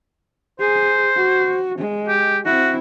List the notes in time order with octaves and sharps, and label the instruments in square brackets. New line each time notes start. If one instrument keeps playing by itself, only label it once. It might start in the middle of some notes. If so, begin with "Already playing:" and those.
[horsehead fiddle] G#4 [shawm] C5
[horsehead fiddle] F#4
G#3
[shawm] G4
[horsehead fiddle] C4 E4 [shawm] F#4